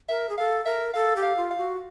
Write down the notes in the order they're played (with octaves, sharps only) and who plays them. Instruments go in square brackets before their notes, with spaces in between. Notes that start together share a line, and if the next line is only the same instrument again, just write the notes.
[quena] A#4 [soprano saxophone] E5
[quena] G#4
[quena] A4 [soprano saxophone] F5
[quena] A#4 [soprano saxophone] E5
[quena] A4 [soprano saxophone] F5
[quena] G4
[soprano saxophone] F5
[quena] F4
[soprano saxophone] F5
[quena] F#4